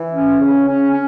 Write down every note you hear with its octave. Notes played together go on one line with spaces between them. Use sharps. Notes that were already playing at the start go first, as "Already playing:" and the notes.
Already playing: E3
C#4
C#3
C#4
C#4